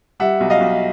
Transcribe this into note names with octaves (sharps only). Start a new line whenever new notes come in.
G3 E5 F#5
B1
D#5 F5
B1